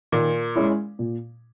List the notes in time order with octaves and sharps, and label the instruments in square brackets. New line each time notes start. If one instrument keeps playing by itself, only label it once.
[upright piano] A#2 [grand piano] D#3
[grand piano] G#3 C#4 E4
A#2